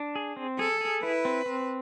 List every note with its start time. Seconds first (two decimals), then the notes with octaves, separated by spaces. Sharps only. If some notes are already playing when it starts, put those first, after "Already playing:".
Already playing: D4
0.15 G#4
0.36 C4
0.58 G#4 A4
0.81 G#4
1.02 E4 B4
1.25 C4
1.46 C4